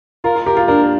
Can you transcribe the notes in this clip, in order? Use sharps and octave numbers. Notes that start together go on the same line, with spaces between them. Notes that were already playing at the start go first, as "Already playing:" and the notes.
F4 A#4
F4
G4 A#4
F4
D4 A#4